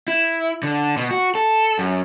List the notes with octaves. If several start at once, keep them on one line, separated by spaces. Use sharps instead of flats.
E4
D3
B2
F#4
A4
F#2